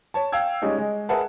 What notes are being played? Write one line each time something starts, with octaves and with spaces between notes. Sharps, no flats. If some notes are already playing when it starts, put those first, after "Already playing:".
C#5 A5
F5 G5 E6 G#6
G3 G#3 C#4 D#4
G#3
G#4 A#4 B4 E5 F#5 A5